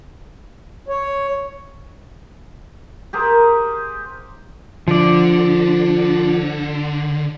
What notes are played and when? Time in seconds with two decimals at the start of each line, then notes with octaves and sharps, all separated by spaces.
0.88 C#5
3.13 G4 G#4 A#4 C5
4.88 D3 F3 D5